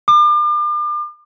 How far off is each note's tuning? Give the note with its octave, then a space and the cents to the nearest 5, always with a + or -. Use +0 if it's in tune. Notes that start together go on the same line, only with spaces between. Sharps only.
D6 +40